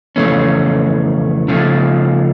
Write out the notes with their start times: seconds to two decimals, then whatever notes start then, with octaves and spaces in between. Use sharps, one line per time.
0.16 F2 C#3 E3 A3 C#4
1.48 C#3 F3 A3